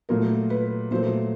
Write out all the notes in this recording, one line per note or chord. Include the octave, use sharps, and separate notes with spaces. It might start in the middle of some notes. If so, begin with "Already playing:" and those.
A#2 F#3 A3 A#4
B4
A#2 F#3 A3 C5